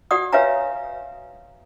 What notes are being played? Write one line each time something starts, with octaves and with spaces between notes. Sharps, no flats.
F#4 D5 F#5 D#6
B4 C#5 E5 F5 G#5 A#5